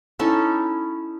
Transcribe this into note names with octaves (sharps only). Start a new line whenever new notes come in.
C#4 D#4 E4 A4